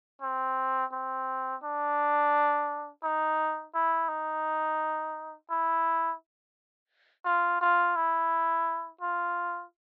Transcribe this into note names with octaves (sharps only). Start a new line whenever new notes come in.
C4
C4
D4
D#4
E4
D#4
E4
F4
F4
E4
F4